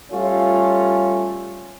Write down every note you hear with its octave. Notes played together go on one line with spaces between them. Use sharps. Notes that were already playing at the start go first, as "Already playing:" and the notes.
G3 A3 C#4 F4